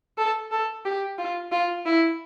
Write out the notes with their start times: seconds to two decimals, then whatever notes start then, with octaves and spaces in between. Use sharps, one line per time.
0.18 A4
0.51 A4
0.85 G4
1.18 F4
1.52 F4
1.86 E4